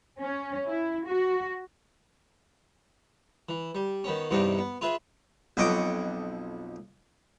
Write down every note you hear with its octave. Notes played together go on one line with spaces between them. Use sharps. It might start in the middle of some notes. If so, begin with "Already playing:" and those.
C#4
E4
F#4
E3
G3
D#3 B3 C#4
E2 G2 C3 B3 D4 D#4
B3
F4 G#4 B4 E5
B1 F2 B4 D#5 C#6 D6